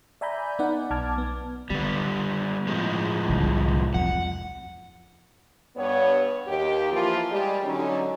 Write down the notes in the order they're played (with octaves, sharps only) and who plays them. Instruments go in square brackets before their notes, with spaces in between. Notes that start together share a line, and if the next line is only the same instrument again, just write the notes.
[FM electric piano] D5 E5 G#5 A#5 B5 G6
B3 D#4 D5 F#5
B1 A5 D6 F6 G#6
B3
[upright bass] D3 [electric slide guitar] G3 B3
[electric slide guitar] A2 F3 G#3
[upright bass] C2 D3
[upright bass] F2 [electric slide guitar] F#5
[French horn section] G2 B3 C#5
D#2 G4
E3 F3 A#3 F4
G3 G#3 G4
D3 F#3 C#4 D#4